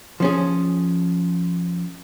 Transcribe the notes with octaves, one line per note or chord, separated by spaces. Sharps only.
F3 C#4 G#4